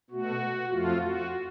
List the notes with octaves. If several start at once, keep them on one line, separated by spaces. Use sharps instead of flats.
B2 A3 F#4
F2 F3 A3 F4
F#4